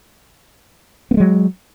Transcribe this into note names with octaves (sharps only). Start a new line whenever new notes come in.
F#3 G#3 A#3 B3